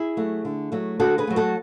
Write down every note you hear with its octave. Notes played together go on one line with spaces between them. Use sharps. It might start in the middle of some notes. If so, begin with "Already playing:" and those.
Already playing: E4 G#4
F#3 A3
D3
F#3 A3
D3 F#4 A4
G#4 B4
F#3 A3
F#4 A4